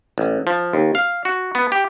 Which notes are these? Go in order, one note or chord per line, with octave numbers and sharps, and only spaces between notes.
A1
F3
D#2
F5
F#4
B3
G4